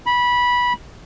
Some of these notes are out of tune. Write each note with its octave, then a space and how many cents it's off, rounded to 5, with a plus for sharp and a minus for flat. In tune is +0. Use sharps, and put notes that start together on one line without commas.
B5 -15